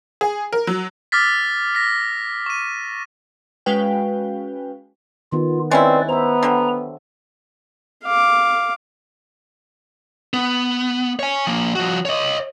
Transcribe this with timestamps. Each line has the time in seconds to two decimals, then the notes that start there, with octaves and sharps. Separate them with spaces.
0.21 G#4
0.53 A#4
0.67 F#3
1.12 D6 E6 F6 A6 B6
1.75 E6 A#6 B6
2.46 C#6 D#7
3.66 G#3 C#4 F#4 B4 F5 G5
5.32 D#3 B3 F4
5.71 G#3 C4 C#4 E4 B4 D5
6.09 B3 C5 E5 A#5
6.43 D3 F#3 G3
8.04 F5 D6
10.33 B3
11.19 C#5 G#5
11.47 F3 A#3
11.75 F3 F#4
12.05 C#5 D#5